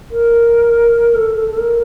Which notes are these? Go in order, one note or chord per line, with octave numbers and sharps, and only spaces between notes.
A#4
A4
A4
A4
A#4